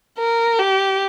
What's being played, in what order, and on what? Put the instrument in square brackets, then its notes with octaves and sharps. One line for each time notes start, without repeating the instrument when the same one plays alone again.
[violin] A#4
G4